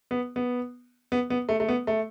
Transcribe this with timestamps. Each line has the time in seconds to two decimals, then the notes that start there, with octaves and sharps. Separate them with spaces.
0.11 B3
0.36 B3
1.12 B3
1.30 B3
1.49 A3
1.60 A3
1.69 B3
1.87 A3